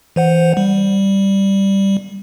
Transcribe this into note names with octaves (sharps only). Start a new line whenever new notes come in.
E3 C5 F#5
G3